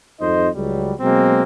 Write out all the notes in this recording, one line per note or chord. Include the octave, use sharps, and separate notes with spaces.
G#1 F2 D#4 C5 D#5
C#2 F#3 G3
B2 F#3 G#3 A#3 C4